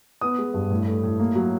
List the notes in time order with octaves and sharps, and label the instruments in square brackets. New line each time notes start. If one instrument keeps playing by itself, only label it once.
[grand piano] B3 D#6
G#3
G2
A2
A3
A2
A#3
F#3